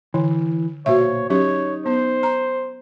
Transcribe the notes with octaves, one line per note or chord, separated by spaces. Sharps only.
D3 E3
B1 A#2 F#4 C5 C#5 E5
F#3 C#4 D#4 G4 C#5
B3 C5
A#5